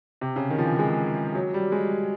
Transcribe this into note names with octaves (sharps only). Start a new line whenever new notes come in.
C3
C#3
D#3
F3
E3
G#3
F#3
G3
G#3